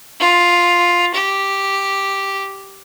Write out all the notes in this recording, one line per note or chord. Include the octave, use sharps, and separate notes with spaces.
F4
G4